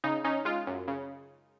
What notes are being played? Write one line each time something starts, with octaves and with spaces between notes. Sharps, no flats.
C#3 D#4
C#4 D#4
G#3 F4
F#2
C#3